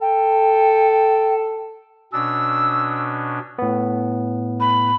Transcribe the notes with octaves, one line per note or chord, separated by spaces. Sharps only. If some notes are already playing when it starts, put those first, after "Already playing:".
A4 G5
B2 C#4 D4 E6
A2 B3
B5